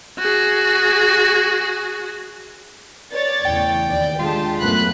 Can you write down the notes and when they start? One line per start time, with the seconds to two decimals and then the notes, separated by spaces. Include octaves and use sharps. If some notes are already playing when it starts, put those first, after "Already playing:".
0.19 F#4 G#4
3.12 C#5 D5 A6
3.45 E2 A2 C#3 G5
3.89 D#2 D5
4.19 D3 G#3 F4 G4 A5
4.58 F#2 A3 B3 B5 F#6